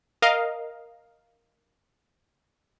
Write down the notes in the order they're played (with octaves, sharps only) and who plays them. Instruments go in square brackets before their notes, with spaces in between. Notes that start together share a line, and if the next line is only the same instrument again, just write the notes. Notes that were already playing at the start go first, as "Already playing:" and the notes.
[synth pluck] A#4 D#5 F5